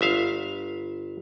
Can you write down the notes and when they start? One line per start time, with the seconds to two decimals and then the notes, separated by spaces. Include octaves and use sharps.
0.01 G1 E5 F5